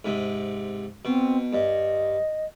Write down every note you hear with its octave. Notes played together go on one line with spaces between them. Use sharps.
G#2 C3
B2 C4
G2 D#5